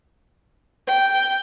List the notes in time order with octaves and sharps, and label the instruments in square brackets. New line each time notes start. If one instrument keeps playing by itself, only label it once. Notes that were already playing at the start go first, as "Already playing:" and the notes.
[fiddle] G5